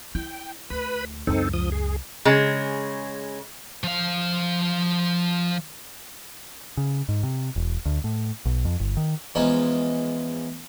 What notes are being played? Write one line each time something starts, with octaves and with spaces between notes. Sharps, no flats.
E4 G5
D2 B4 B5
C#2 F#2 C4 D#4 A4
F3 D#6
G#4
C#3 G#3
F3 F5
C#3
G#2
C3
E1
D2
A2
B1
F2
G1
D#3
E2 F3 G#3 C#4 D#4